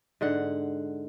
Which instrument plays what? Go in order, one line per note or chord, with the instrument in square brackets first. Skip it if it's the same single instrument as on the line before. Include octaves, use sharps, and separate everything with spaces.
[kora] G#2 D3 F#5